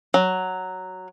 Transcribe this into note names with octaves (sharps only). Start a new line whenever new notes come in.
F#3